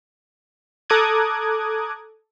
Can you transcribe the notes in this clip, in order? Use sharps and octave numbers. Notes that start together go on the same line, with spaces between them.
A4 A#5 D6 D#6 F#6 G#6